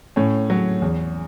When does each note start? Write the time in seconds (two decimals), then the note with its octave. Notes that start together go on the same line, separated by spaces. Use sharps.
0.16 A2 C#4
0.50 F#3
0.82 E2